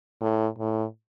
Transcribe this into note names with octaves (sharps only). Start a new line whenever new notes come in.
A2
A2